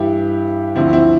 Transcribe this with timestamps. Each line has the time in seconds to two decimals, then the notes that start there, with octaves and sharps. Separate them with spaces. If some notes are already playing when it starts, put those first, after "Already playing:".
Already playing: G2 E3 G3 E4 G4
0.75 D2 D3 F3 C4 E4
0.93 C4 E4